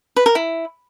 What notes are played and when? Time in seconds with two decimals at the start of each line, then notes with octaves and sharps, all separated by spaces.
0.16 B4
0.26 A#4
0.35 E4